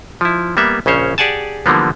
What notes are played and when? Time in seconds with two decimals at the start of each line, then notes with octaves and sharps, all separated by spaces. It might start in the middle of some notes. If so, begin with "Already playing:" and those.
0.21 F3 E4
0.57 G3 A#3 B3 E5
0.86 A#1 C#3 C#4 C5 C#5
1.18 G4 G#4 D5 F#5 G#5 A5
1.66 D3 E3 F3 G3 A#3 B3